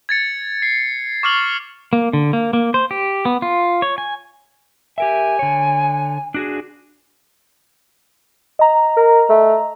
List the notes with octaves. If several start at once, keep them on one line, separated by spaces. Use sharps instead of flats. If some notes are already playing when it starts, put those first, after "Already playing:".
G#6 A6 C#7
C7
C#6 D6 F6 C7 F#7
A#3
D3
A#3
A#3
C5
G4
B3
F4
C#5
G#5
G4 A#4 E5 G#5
D3 C#5
D4 F#4 G#4
D#5 A#5
A#4
A3